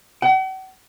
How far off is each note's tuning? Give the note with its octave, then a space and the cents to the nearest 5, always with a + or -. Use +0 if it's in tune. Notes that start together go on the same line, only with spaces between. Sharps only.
F#5 +45